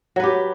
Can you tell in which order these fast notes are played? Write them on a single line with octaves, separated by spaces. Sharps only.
F#3 B4 G4